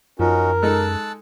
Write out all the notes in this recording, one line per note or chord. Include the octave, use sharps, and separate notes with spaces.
F#2 F3 C#4 D#4 F#4 A#4
G#3 D#4 A4 A5 E6 F#6